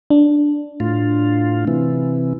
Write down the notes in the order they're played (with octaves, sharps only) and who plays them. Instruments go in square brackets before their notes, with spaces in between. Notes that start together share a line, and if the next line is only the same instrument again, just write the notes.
[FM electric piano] D4
[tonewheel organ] A2 F4
C3 E3